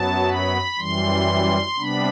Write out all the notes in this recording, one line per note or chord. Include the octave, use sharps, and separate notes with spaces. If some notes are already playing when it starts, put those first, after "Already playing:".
Already playing: F#2 F#3 B3 A5
B5
F#2 E3 G3 C6
C3 G3 B3 D4 B5